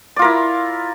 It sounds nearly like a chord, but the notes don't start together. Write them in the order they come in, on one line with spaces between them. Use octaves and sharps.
D5 F4 A#4 E4